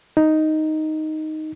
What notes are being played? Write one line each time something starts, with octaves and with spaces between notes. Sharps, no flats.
D#4